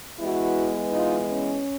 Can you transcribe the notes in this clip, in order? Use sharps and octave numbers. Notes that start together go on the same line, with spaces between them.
E3 G#3 B3 E4 F#4
D#4 F4
C#4